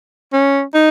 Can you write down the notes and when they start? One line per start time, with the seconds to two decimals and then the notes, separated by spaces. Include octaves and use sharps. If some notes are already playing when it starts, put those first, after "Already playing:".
0.33 C#4
0.74 D#4